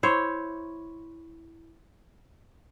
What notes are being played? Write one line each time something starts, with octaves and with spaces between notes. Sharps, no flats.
E4 C5 C#5